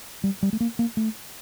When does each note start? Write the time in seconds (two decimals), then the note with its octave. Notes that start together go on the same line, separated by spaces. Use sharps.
0.24 G3
0.43 G3
0.53 A3
0.60 A#3
0.79 A#3
0.97 A3